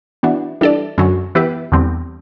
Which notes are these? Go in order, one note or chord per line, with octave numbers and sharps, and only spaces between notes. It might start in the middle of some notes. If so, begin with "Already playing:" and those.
E3 B3 D4 F#4
E3 G3 D4 A4 D5
F#2 D3 F#3
E3 B3 E4 G4 B4
E2 D3 G3 C4